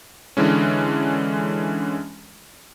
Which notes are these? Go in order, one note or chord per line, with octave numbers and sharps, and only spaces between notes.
D3 E3 G#3 C#4